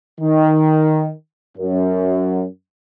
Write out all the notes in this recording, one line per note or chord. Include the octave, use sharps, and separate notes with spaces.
D#3
F#2